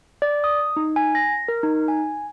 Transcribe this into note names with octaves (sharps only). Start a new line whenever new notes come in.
D5
D#6
D#4
G#5
A#6
A#4
D#4
G#5